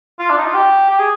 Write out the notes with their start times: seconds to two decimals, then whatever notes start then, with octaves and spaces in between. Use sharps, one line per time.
0.19 F4
0.30 D4
0.38 D#4
0.46 F4
0.54 G4
0.89 G4
0.99 G#4